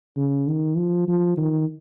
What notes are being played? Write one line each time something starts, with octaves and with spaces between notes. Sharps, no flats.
C#3
D#3
F3
F3
D#3